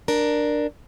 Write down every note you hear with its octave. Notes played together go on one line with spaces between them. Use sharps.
D4 A#4